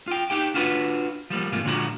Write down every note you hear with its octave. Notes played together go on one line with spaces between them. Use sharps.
F4 G5
D#4 G4 G5
D4 F4 F#4 B4
F3 G3 A#3
G#2 C3 G3 A#3 F4
A#2 D3 F3 G#3 F#4 A#5